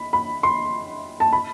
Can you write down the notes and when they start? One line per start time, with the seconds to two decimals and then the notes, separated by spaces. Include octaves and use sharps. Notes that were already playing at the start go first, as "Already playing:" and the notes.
Already playing: B5
0.13 B5
0.43 C6
1.20 A5
1.33 B5